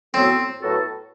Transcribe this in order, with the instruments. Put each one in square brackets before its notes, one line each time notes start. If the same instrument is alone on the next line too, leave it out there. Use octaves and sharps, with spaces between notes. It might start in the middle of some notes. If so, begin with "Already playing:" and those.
[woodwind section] A2 F#3 B3 F#4 A4 [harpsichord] C4
[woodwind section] A2 F#3 B3 F#4 A4